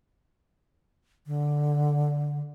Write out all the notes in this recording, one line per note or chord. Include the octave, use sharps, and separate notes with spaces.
D3